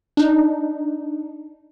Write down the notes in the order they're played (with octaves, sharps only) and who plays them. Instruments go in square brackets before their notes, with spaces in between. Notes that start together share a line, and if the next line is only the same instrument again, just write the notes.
[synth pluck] D4 D#4